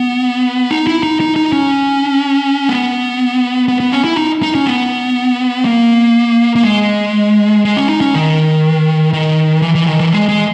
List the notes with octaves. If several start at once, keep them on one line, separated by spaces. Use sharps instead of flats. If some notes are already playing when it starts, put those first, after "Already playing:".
Already playing: B3
D#4
E4
D#4
D#4
D#4
C#4
B3
B3
B3
C#4
E4
D#4
D#4
C#4
B3
A#3
A#3
G#3
G#3
C#4
D#4
C#4
D#3
D#3
E3
E3
D#3
E3
G#3
G#3